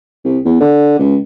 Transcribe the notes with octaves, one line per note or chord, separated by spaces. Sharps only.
C2
E2
D3
C#2